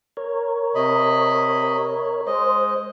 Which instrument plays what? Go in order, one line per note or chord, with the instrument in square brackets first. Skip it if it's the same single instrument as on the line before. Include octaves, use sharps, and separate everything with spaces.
[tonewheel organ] A#4 C#5
[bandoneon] C3 D#5 B5
[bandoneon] G#3 D#5 [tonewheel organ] C5